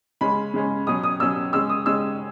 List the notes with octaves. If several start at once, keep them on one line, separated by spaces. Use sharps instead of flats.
C#3 G#3 C#4 B5
C#3 G#3 C#4
B2 F#3 C#4 D#6
D#6
B2 F#3 C#4 E6
C#3 G#3 C#4 E6
D#6
C#3 G#3 C#4 E6